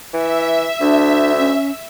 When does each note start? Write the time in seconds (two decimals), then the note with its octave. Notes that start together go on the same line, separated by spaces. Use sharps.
0.13 E3 E5
0.80 D2 D4
1.38 C#4